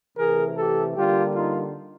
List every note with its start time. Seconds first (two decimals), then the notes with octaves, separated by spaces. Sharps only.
0.17 C3 E3 A3 G#4 A#4
0.57 G4 A4
0.96 D3 G3 A#3 F4 G4
1.35 D#4 F4